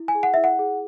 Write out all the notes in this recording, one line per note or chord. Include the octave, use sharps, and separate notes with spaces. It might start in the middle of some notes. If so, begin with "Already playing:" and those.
Already playing: E4
G#5
G#4
F#5
E4 E5
F#5
G#4